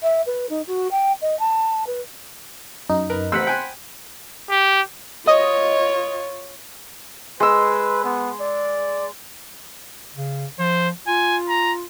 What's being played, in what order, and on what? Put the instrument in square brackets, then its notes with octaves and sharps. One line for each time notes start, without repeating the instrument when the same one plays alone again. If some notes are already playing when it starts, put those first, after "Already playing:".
[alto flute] E5
B4
D#4
F#4
G5
D#5
A5
B4
[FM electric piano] F#2 D#4
[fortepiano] A#4 B4
[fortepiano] A1 E6 [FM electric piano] C5 F#5 B5
[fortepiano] G5 G#5
[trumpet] G4
[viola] F4 C#5 [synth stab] D#5
[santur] G#3 E6 [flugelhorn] B4
[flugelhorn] B3
D5
[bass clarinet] C#3
[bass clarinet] F3 [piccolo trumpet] C5
[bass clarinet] F4 [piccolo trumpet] G#5
[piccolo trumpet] A#5